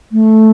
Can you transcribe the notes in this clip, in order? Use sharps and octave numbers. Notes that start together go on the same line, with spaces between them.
A3